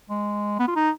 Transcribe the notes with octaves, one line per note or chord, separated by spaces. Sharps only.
G#3
B3
F4
D#4